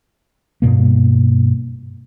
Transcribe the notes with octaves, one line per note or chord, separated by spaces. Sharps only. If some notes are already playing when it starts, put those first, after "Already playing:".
G2 B2 A#3